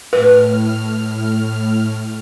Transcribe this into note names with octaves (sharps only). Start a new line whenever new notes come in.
A2 B4 F6